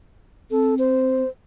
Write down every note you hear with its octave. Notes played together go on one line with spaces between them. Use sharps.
C4 A4
C5